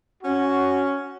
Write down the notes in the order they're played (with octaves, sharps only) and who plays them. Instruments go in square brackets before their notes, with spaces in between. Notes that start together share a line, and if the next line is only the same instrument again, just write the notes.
[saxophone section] C#4 [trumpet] F#4